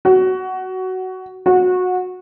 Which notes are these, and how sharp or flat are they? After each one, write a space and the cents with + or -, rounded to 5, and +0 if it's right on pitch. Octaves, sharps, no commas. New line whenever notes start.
F#4 +15
F#4 -20